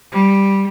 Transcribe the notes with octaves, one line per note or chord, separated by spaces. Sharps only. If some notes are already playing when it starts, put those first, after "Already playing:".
G3